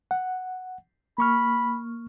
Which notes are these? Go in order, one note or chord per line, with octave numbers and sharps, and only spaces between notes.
F#5
A#3 B5 C#6 F6